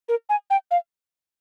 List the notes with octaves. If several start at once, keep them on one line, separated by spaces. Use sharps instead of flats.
A#4
G#5
G5
F5